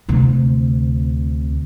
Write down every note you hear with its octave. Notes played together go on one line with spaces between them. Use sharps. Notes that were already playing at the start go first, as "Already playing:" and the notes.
D2 C3